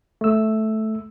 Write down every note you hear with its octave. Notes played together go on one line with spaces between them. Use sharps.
A3 E6